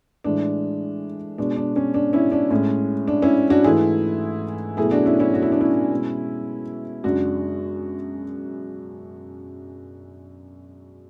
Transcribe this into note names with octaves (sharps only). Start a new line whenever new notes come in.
A2 E3 G#3 D4
B2 G#3 D4
D4
C#4
D4
C#4 E4
D4
A2 G#3 C#4
D4
C#4 E4
D4 F#4
G#2 E3 A3 E4 G#4
B2 F#3 A3 E4 G#4
D4 F#4
C#4 E4
C#4 E4
F#4
E4
D4
C#4 E4
B2 G#3
F#2 C#3 G#3 D4 F#4